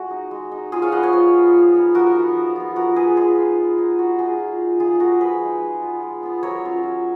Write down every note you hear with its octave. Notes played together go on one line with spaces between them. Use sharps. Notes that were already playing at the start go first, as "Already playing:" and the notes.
Already playing: G#3 F#4
D#4
G#3
D#4
F#3 F4 G#4
C#5 F5
B3 F4 D#5 F#5
C#5 F5
F#3 C#5 F5
B3 F4
F3
B3 D#4
F3 F#4 A#4
B3 D#4
F3
B3 F4
F3 F#4 A#4
B3 F4 G#4 B4
G#3 F4 G#4
B3 D#4
G#3
B3 D#4
A#3 F#4
D#4 F4 G#4
A#3
D#4
F3 F4 G#4
G#3 D#4 F#4 A#4
F3 G#4 B4
G#3 D#4
G#3
B3 F4
G#3
B3 F4
F#3 A#4 C#5
C#4 F4
F#3